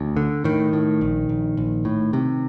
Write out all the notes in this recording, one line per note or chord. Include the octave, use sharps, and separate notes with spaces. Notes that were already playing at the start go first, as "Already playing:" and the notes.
Already playing: D2
D3
A2 D#3
A2
A#1
A#1
A#1
A2
C3